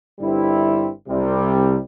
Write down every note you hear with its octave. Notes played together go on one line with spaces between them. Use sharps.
G1 G2 G3 C4 E4
C2 C3 G3